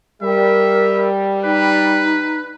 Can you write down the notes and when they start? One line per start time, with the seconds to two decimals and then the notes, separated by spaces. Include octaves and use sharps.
0.22 G3 A#4 E5
1.44 D#4 B4